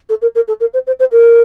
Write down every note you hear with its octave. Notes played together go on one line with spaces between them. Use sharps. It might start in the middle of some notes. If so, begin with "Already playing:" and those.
A4
A#4
A#4
A4
A#4
C5
C5
C5
A#4